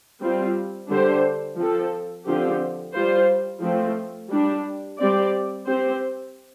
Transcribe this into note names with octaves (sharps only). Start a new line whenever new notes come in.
G3 C4 F4
D3 G3 D4 G4 C5
F3 C4 A4
D3 F3 C4 G4
G3 F4 C5
F3 A3 C4
G3 D4 G4
G3 C4 G4 D5
C4 G4 C5